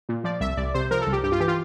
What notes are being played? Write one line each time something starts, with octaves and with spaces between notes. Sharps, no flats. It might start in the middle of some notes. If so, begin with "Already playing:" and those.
A#2
F3 D5
C2 E5
C2 D5
C3 C5
F3 A#4
A4
C2
G4
G2 G4
F4
E3 G4
F4